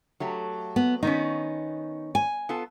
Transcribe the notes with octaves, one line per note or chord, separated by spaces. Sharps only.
F#3 A3 G4
B3
D#3 B3 C#4 D#4
G#5
B3 F4 A4